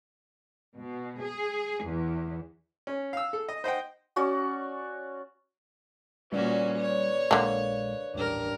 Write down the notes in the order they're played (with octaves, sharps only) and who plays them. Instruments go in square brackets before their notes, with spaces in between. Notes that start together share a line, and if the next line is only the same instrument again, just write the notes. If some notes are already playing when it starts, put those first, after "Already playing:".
[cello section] B2
G#4
E2
[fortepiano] C#4
F5 E6
A4
D#5
C5 D#5 F#5 G5
[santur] C#4 F#4 D5 C#6
[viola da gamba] A#2 C#4 F#4 [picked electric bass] G3 [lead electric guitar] B4 D5
[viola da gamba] C#5
[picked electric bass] A#1 A#2 G#3 [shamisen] D3 A#3
[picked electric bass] D#1 A1 [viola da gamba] G2 A#4